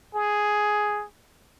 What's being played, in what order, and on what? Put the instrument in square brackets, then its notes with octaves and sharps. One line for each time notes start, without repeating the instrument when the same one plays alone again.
[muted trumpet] G#4